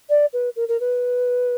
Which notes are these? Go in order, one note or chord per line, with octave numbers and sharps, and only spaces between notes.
D5
B4
A#4
A#4
B4